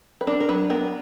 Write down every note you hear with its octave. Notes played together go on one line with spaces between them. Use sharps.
B4
D4 A#4
A#4
F#3 B4
B3 A#4